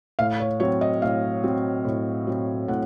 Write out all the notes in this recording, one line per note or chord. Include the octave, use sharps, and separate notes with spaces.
A2 F5
C#5
F#3 C4 C#5
D#5
A2 F5
F#3 C4
A2
F#3 C4
A2 F#5